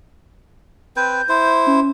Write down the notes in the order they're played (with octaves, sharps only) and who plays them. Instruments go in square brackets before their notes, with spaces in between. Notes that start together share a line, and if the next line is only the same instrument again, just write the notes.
[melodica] C4 B4 [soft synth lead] G6
[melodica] E4 C5
[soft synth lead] C#4